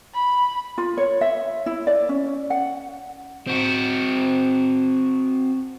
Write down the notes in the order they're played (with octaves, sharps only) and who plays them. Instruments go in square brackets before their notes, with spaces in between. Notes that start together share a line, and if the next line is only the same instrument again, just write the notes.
[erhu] B5
[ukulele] F4
C#5
E5
E4
D5
C#4
F#5
[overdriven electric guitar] C4 F#4